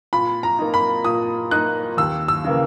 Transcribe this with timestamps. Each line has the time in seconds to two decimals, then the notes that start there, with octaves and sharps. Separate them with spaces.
0.13 A#2 B5
0.43 A#5
0.59 A#3 D#4
0.74 B5
1.04 A#2 D#6
1.51 A#3 D#4 F#6
1.97 D#2 E6
2.28 E6
2.44 C#3 E3 A#3